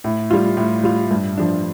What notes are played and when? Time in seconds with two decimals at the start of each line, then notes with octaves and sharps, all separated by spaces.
0.04 A2
0.31 G3 F4
0.57 A2
0.84 G3 F4
1.11 G2
1.37 F3 D4